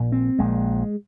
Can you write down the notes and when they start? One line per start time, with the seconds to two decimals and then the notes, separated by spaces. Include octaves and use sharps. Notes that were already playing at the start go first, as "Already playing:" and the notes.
Already playing: A#1 A#2
0.12 C4
0.39 A#1 A#2 G#3